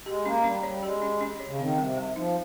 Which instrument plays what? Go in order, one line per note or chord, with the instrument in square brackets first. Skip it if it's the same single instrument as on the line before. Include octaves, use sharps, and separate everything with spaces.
[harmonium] G#3 [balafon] G4
[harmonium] A#3 [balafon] C#4
[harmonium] G3 [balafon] C#4
[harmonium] G3 [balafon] C#5
[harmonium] G#3 [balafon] G4
[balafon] C#4
C#4
C#5
[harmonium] C#3
[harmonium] D#3 [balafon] C4
[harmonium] C3 [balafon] G3
[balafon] G3
[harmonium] F3 [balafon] D#4